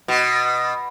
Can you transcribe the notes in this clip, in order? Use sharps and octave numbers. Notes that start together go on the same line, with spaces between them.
B2